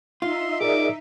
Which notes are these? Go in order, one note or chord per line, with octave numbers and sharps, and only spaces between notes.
D#4 F4 E5 C6
G#4 A#4 D5 D6